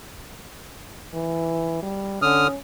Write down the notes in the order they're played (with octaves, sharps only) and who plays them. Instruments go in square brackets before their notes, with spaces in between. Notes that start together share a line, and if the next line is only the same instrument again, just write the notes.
[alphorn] E3
G3
[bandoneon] D3 D#6 F6 [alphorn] C#4